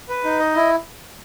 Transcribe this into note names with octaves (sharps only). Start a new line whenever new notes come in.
B4
D#4
D#5
E4